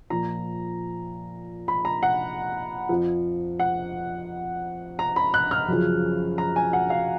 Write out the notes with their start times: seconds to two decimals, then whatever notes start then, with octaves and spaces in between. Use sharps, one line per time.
0.10 A#2 F3 A#5
1.68 B5
1.85 A#5
2.03 F#5
2.89 F2 F3
3.60 F#5
4.99 A#5
5.16 B5
5.34 F#6
5.51 F6
5.68 F#2 C#3 F3
6.38 A#5
6.56 G#5
6.73 F#5
6.90 F5